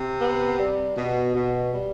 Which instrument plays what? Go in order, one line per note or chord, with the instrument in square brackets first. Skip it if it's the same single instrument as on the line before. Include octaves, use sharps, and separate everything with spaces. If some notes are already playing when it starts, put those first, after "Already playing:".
Already playing: [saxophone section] C3
B3
G3
B2
B2
G3